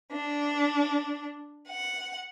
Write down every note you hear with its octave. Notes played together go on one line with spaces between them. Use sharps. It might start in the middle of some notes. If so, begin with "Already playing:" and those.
D4
F#5